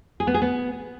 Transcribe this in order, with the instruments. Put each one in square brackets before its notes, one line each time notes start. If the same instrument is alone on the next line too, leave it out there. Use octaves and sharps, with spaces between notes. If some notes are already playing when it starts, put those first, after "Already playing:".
[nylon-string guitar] G#4
B3
G#4
B3